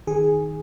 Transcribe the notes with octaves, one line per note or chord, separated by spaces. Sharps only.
D#3 G#4